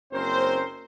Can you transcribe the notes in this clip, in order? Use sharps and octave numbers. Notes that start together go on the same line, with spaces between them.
F#1 C4 C#4 A#4 C5